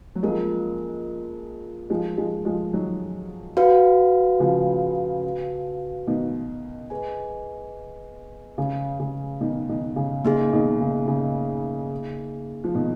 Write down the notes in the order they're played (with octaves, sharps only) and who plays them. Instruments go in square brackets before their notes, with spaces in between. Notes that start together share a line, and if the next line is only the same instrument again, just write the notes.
[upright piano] F#3
[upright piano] F3 G#3 [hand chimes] A#3 C#4 F4 A#4
[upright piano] F3 G#3
F3 G#3
F3 G#3
D#3 F#3
[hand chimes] F#4 B4 F5
[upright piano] C#3 F3
B2 D#3
[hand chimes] G#4 B4 D#5 G#5
[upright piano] C#3
C#3
B2 D#3
B2 D#3
C#3
[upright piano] C#3 [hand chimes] A#3 D#4 G#4
[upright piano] B2 D#3
C#3
C#3
F3
B2 D#3